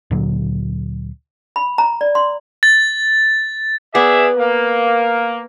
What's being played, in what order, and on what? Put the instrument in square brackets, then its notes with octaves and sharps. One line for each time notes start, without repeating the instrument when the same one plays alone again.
[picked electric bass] D2 A#2 D3 F#3
[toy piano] B5
A#5
D5
C6
[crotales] A6
[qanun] B3 [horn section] G#4 D5 E5
[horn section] A#3